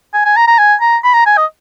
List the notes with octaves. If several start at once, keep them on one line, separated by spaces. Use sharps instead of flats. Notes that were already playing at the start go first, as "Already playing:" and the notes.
G#5
G#5
A#5
A#5
G#5
A#5
B5
A#5
G#5
D#5